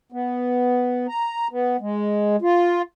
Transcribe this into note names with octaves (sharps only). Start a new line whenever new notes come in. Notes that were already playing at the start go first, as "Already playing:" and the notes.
B3
A#5
B3
G#3
F4